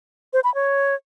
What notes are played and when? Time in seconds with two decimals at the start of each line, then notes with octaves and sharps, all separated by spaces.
0.33 C5
0.44 B5
0.55 C#5